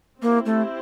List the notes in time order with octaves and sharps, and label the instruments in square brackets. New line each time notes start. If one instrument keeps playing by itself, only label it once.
[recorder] A#3 [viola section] C4 E4 G4 C5
[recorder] A3